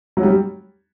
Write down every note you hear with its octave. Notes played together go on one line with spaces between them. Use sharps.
F#3
G3